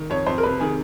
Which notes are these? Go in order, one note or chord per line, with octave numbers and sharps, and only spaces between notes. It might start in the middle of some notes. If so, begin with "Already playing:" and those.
Already playing: D#3
F2 C#5
F2 C5
A#4
C3 B4
D#3 G#4